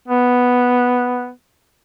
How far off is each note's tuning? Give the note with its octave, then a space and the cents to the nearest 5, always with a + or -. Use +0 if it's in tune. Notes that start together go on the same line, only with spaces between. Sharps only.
B3 +0